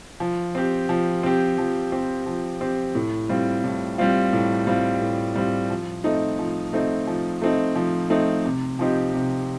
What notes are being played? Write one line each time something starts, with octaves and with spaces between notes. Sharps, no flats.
F3
C4 G4
F3
C4 G4
F3
C4 G4
F3
C4 G4
A2
G3 C4 F4
A2
G3 C4 F4
A2
G3 C4 F4
A2
G3 C4 F4
F3
A3 C4 D#4
F3
A3 C4 D#4
F3
A3 C4 D#4
F3
A3 C4 D#4
C3
F3 C4 D#4 G4
C3